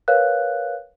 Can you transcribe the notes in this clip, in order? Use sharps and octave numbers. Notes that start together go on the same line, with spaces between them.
A#4 B4 C#5 F5 F#6